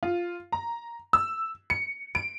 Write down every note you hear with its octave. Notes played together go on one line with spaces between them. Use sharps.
F4
A#5
E6
C#7
D7